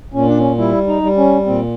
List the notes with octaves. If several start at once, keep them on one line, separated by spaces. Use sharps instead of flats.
A#2 C#4
D4
C#4
G3 E4
D#4
G3
C#4
A#2 C4